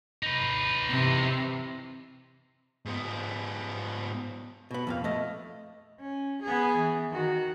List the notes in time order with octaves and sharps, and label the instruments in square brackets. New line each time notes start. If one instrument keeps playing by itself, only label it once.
[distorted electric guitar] D#4 B4
[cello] C3 E3
[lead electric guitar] G#2 B3
[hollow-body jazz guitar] B2 B3
F2 A#2 F5
A3 D#5
[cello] C#4
B3 G#4
E3
D#3 F#4